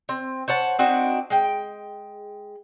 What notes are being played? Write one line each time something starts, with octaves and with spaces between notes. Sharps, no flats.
C4
C5 C#5 F#5 A5
C4 D4 D#4 F#4
G#3 G5